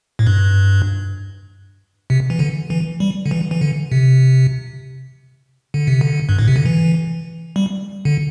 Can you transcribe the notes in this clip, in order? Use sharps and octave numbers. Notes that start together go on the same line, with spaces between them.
A2
G2
C3
E3
D3
E3
G3
D3
E3
E3
D3
C3
D3
C3
D3
G2
A2
C3
D3
E3
G3
D3